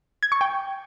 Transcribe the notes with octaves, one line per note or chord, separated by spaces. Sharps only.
G#6
C#6
G5